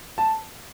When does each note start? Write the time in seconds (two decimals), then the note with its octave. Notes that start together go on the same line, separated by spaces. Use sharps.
0.18 A5